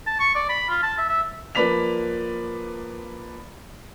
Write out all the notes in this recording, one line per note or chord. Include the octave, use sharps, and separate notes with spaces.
A5
C#6
D5
B5
F4
A5
E5
E5
F3 A#3 B4 D5 B6 F7